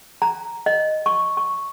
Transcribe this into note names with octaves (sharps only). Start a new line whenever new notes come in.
A#5
D#5
C#6
C#6